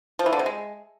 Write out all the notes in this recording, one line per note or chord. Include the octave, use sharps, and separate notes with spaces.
F3
E3
D3
C3
G#3